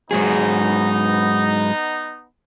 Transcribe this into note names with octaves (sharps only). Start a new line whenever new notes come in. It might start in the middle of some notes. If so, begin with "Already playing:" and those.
G#2 F#3 B3 D#4 G#4